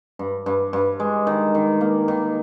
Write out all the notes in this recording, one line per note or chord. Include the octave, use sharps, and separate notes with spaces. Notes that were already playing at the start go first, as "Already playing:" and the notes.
G2
G2
G2
G#3
D#3
D#3
A#3
D#3